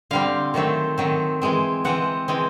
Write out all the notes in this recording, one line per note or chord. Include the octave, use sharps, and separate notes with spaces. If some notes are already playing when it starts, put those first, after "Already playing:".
D3 G3 C4 F5
D#3 F#3 A3 C4
D#3 F#3 A3 C4
E3 G#3 C4
E3 G#3 C4 F#5
E3 G#3 C4